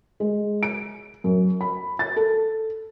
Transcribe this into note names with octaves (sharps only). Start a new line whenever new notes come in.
G#3
D7
F#2
B5
A6
A4